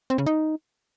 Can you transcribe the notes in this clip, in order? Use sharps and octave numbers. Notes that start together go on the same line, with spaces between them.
C4
C#3
D#4